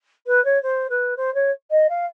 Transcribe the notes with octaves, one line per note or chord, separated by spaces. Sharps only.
B4
C#5
C5
B4
C5
C#5
D#5
F5